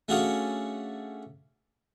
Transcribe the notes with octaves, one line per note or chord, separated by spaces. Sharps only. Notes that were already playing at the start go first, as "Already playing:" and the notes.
A3 C#4 D4 F#4 G#4 F5